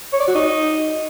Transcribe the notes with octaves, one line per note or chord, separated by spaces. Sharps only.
C#5
D5
F#4
D#4